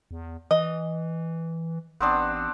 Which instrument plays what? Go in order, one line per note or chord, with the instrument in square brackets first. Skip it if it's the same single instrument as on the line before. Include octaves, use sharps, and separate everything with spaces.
[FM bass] E2
[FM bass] E3 [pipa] D#5
[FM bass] A1 [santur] B3 C4 D4